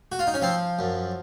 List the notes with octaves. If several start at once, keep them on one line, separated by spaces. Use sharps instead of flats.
F#4
F4
D#4
C#4
F3 C4
F#2